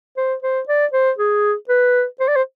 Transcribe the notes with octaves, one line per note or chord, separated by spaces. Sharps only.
C5
C5
D5
C5
G#4
B4
C5
D5
C5